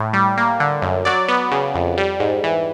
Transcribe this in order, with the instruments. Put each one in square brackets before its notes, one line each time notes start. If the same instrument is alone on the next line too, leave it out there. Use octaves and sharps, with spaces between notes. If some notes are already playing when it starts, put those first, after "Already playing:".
Already playing: [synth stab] A2
G3
A#3
D3
F#2
F#3 D5
B3
C#3
F2
G3
G#2
E3